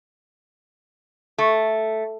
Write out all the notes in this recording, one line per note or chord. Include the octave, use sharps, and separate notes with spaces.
A3